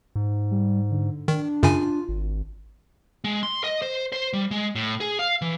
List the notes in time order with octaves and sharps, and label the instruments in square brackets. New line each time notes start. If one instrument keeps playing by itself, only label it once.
[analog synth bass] G#2
[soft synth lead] G3
D3
[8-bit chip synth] D#3 [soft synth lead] D4
[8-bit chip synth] F#2 C#3 G#5 [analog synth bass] F4
[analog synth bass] G#1
[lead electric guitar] G#3
C6
D#5
C5
C5
G3
G#3
A2
G#4
F5
E3